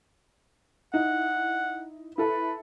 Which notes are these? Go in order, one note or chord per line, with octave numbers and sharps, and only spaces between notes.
D#4 E4 F#5
E4 A4 B4